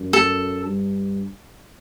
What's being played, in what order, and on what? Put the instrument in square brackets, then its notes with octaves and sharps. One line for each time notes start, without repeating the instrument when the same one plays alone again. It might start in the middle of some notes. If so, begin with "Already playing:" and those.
Already playing: [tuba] F#2
[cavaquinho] A4
[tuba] G2